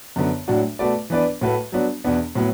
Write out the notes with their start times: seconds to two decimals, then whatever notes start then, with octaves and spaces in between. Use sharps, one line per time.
0.16 F#2 D3 B3
0.48 A2 F#3 D4 F#4
0.79 B2 A3 F#4 B4 D5
1.10 E3 B3 D4 B4 D5
1.41 A2 A3 F#4 B4
1.72 F#3 B3 D4 F#4
2.04 E2 B2 B3 D4
2.35 A2 F#3 B3